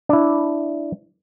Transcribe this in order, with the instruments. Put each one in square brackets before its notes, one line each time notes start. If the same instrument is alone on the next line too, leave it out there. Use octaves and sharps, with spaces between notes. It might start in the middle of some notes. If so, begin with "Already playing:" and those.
[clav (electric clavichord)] D4 E4